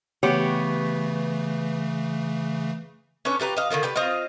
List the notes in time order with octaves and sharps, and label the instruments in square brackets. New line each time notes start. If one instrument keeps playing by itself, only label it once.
[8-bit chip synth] C#3 E3 A3 [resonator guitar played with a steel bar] B3 G4 C#5
[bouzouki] C#4 D4 B4 C#5
F4 G4 B4 A#5
D#5 F5
D3 D#3 A3 F4
G4 B4 D5
C4 F4 D#5 F5